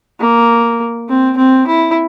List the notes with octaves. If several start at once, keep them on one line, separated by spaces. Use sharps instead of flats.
A#3
C4
C4
E4